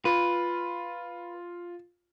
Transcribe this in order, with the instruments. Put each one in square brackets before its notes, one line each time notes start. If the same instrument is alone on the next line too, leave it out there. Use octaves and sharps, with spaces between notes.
[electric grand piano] F4 [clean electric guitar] B4